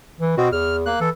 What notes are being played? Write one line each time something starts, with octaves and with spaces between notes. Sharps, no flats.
E3
B2 C4 F#4
E2 F6
A#3 F#6
E3 A4